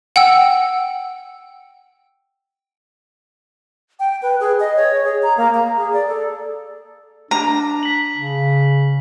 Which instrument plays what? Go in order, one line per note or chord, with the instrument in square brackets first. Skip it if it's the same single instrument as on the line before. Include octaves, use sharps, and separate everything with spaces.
[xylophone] F#5 G5 E6
[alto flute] G5
B4
G#4
D#5
C#5
G#4
A#5
A#3
A#5
G#4
D5
A4
[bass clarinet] D4 [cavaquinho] A#5
[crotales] B6 F#7
[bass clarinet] C#3